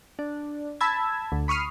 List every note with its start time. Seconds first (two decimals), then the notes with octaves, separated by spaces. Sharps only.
0.19 D4
0.81 A5 B5 E6 G#6
1.32 D2
1.48 B5 C#6 D#6 F6 C7